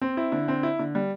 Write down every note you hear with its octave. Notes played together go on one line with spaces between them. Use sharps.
C4
E4
D3
C4
E4
D3
G3